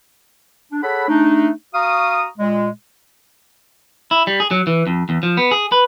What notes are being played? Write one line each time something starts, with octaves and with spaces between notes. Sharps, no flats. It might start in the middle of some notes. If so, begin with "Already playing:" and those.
D4
G#4 A4 C#5 F#5 A5 B5
A3 D4 D#4
F#4 F5 A#5 C#6 D#6
A#2 G#3
E4
G3
G#4
F#3
E3
F2
E2
F3
B3
G#4
B4